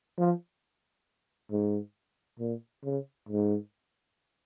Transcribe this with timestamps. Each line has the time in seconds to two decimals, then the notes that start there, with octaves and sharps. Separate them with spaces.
0.18 F3
1.51 G#2
2.40 A#2
2.84 C#3
3.29 G#2